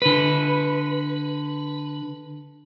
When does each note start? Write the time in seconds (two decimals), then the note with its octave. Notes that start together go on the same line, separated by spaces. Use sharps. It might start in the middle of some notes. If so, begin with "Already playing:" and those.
0.02 D3 B4